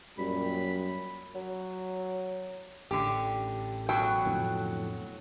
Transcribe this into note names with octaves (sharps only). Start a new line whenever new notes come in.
F#2 A#2 F#3 G3 B5
F#3
A1 D3 G4
B2 F#3 G5
F2 A2 D3